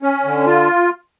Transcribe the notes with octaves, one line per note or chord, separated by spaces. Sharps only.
C#4
D3
F4